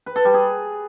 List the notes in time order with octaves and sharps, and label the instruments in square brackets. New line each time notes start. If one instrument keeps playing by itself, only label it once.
[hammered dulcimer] B4
A4
G3
G#4